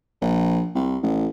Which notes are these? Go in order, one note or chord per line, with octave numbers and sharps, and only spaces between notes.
A#1
C2
A1